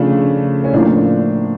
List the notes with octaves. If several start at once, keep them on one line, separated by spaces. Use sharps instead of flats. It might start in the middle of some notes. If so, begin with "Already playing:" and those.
Already playing: C#3 F3 A3 D4
C#4
A2 F3 A#3 D4